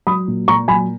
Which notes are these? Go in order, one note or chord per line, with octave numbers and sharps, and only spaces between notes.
F#3 B5 D#6
A#2
A#2 A#5 C#6
F#3 G#5 B5